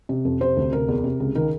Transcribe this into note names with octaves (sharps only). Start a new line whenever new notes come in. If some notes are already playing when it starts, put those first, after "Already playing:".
C3
F2
C3 C5
D2
C3 A#4
E2
C3
C#2
D#3 A#4